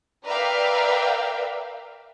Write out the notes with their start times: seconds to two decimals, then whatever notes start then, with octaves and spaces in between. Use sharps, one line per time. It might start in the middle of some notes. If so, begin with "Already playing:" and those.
0.24 A#4 B4 D5 E5 F5 G5